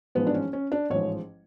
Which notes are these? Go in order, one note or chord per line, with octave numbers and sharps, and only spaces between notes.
A1 G#2 F3 G#3 B3
D4
C#4
C#4
D4
A1 G#2 F3 G#3 C#5